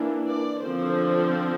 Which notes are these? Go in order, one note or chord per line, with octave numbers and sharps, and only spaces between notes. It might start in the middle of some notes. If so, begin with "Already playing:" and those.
Already playing: E3 A#3 D4
D5
D3 F3 C4 C5